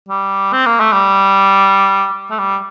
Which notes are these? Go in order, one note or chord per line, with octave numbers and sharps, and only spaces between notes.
G3
C4
A#3
A3
G3
A3
G3